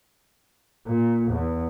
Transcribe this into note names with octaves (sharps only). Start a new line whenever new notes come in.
A#2
E2